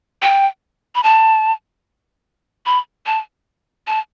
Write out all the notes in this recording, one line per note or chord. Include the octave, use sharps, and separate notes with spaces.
G5
B5
A5
B5
A5
A5